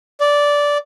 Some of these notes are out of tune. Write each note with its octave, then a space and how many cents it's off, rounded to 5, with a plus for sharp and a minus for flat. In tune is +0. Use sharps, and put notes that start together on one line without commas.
D5 -10